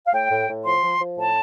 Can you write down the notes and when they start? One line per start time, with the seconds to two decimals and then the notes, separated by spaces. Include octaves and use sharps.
0.06 F5
0.13 A2 G5
0.31 A2
0.49 A2
0.65 F3 C6
0.83 F3
1.00 F3
1.18 A2 A5